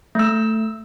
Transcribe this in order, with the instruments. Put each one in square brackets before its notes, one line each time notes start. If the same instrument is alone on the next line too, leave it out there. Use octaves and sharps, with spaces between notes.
[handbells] A3 E6